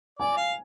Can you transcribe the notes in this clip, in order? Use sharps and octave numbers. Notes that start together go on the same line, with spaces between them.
D5 G#5
F5